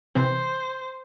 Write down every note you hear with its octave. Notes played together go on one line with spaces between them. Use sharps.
C3 E3 C4 C5